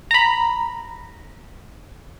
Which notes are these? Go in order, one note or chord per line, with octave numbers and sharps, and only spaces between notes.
A#5 B5